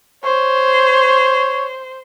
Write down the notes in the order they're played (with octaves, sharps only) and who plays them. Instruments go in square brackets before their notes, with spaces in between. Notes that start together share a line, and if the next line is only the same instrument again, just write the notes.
[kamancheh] C5 [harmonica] C#5